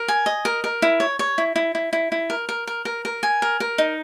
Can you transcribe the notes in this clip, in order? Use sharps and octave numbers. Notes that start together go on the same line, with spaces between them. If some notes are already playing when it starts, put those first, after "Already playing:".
Already playing: A#4
G#5
D#5
A#4
A#4
E4
C#5
C#5
E4
E4
E4
E4
E4
A#4
A#4
A#4
A#4
A#4
G#5
A#4
A#4
D#4